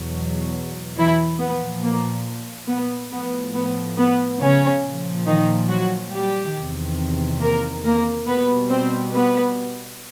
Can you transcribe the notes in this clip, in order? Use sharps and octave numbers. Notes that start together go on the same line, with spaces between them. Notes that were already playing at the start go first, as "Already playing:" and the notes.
Already playing: E2 B2 F#3
E3 E4
A#2 F3 B3
A#3
B3
A2 F3 B3
B3
B3
C#3 C#4
A#2 F3
D#3 D#4
F#3 F#4
G3 G4
E2 C3 D#3
A#3 A#4
A#3 A#4
B2 G3 B3 B4
C4 C5
B3 B4